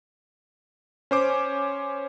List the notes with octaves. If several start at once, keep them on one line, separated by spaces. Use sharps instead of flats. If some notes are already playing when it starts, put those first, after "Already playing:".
C#4 C5 D6